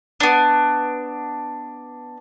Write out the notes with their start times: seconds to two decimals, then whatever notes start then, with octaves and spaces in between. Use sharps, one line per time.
0.20 B3 D4